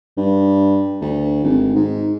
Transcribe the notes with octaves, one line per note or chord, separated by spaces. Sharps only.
G2
D2
G#1
G#2